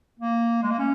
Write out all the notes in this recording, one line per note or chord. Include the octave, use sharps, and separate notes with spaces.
A#3
G#3
A#3
C#4